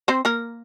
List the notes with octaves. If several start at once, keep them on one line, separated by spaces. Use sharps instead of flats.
C4 C5
A#3 A#4